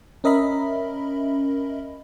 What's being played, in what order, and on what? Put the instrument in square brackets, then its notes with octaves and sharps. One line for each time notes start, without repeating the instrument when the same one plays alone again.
[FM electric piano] C#4 A#4 D#5 E5 B5